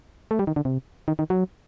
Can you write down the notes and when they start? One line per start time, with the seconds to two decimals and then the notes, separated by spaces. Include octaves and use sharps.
0.31 A3
0.39 G3
0.47 D#3
0.56 D3
0.65 C3
1.08 D#3
1.19 D#3
1.30 F#3